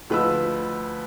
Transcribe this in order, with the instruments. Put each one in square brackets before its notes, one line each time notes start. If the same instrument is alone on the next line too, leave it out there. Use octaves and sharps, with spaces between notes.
[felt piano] D2 F3 B4 D#5 E6